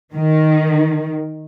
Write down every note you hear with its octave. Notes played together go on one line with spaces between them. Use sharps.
D#3